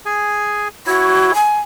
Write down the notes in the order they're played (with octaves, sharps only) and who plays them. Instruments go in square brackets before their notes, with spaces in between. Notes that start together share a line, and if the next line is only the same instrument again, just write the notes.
[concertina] G#4 G#5
[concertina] E4 C#5 [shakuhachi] F#4
[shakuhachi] G#5